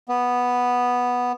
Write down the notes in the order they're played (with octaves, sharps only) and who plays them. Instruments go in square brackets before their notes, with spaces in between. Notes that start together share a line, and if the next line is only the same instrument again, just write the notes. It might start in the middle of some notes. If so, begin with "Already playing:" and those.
[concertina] B3